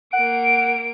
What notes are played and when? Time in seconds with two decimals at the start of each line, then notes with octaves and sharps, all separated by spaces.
0.13 A#3 F#5 D7